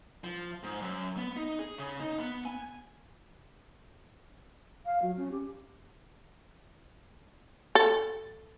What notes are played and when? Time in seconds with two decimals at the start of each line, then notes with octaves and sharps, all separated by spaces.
0.24 F3
0.63 G#2
0.81 F#2
1.17 B3
1.37 D#4
1.59 G#4
1.78 C#3
2.00 D#4
2.18 B3
2.45 G#5
4.86 F5
5.02 F#3
5.17 C#4
5.31 G4
7.75 A4